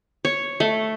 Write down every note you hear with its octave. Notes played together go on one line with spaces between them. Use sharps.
C#5
A3